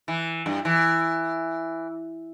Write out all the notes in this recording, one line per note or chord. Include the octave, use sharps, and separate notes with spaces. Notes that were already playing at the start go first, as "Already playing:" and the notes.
E3
G2
E3